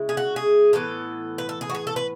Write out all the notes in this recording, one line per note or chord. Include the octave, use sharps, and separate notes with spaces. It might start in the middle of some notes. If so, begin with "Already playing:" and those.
Already playing: C#3 G#3 E4
G#4
F#4
G#4
A2 E3 B3 A4
B4
A4
G#4
F#4
G#4
A4
B4